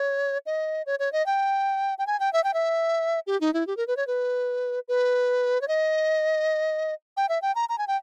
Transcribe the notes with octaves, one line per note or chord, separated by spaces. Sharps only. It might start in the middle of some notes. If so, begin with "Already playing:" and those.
Already playing: C#5
D#5
C#5
C#5
D#5
G5
G5
G#5
G5
E5
G5
E5
G4
D#4
E4
G4
A#4
B4
C#5
B4
B4
C#5
D#5
G5
E5
G5
A#5
A#5
G#5
G5